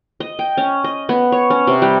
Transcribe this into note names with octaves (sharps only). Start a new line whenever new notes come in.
D#5
G5
C#4
D#5
B3
C#5
C#4
C3
G3